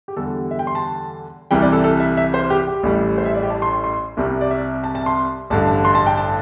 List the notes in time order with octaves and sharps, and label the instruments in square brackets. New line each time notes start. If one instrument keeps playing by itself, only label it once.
[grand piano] G4
E2 D3 G3 A4
E5
G5
C6
A5
C2 C3 E3 G3 G5
D5
A4
A4
E5
E5
C5
G4
G4
A1 A2 G3
C5
E5
D5
G4
A5
C6
C6
C2 C3 G3
D5
E5
A5
A5
C6
A1 G2 D3 A5
A5
C6
A5
G5
A5